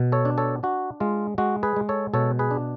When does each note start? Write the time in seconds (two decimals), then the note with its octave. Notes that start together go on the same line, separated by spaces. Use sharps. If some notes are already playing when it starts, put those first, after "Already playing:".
Already playing: B2
0.12 A4 C#5
0.25 D4
0.38 A4 C#5
0.63 D4 F#4
1.00 G#3 F4
1.38 G#3 F#4
1.63 G#4 B4
1.76 G#3
1.89 A4 C#5
2.14 B2 A4 C#5
2.39 G#4 B4
2.51 D4